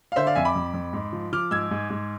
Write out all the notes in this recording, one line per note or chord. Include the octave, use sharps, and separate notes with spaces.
F5
D3 C5 E5
D5 F5
F2 E5 G#5
B5 D6
F2
F2
G#2
F3
F3 D6 F6
G#2 E6 G#6
G#2
G#2